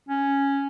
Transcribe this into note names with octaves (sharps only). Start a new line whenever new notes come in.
C#4